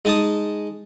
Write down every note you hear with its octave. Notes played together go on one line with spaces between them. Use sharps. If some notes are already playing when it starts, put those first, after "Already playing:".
G#3 D#4 G#5 A5 D#6